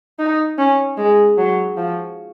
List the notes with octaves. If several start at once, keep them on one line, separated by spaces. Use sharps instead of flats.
D#4
C#4
G#3
F#3
F3